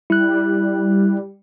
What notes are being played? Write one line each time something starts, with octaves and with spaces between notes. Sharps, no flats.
G3 E4 F#6